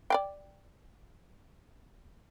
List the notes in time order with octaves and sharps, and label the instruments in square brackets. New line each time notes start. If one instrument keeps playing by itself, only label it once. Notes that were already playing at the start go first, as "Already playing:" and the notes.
[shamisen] D5 F5 G5